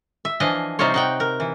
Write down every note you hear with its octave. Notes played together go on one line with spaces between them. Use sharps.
E5
E3 F3 D4 D#5 F5 G#5
C3 G3 D#4 F4 C5 C#5
D#4 F#5 G5
A#4
E3